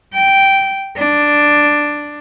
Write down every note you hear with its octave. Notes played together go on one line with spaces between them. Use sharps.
G5
D4